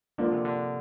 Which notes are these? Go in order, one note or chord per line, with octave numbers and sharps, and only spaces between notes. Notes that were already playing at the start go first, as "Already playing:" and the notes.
D3 F3 A#3 D4 F4
C3
D3